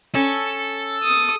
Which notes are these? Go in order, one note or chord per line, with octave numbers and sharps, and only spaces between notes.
C#4 A4
D#6